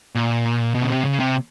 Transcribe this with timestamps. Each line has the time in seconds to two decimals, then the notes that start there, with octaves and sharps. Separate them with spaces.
0.15 A#2
0.75 B2
0.82 C#3
0.90 C3
1.05 C#3
1.20 C3